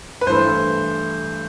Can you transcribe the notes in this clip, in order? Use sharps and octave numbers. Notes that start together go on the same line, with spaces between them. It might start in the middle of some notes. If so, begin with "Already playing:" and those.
B4
G2 E3 A3 C5